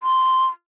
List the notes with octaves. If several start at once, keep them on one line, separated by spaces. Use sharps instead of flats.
C6